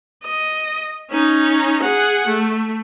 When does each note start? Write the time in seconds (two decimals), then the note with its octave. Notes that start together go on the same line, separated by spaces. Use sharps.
0.24 D#5
1.11 C#4 D#4
1.83 G#4 F#5
2.27 A3